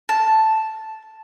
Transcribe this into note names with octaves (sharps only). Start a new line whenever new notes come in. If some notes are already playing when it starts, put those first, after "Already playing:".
A5